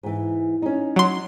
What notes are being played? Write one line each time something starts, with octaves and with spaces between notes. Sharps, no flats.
G#2 E3
C#4 D#4
F#3 C6